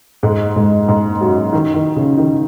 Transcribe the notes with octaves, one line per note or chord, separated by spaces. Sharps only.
G#2 G#3
G#2 G#3
G#2 G#3
F#2 F#3
D#3
D#3
C#3
D#3